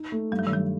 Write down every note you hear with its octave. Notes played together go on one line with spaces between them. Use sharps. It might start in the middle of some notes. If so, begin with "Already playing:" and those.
Already playing: D#4
A3
G2 G3
F#3
D#3
G2 F#3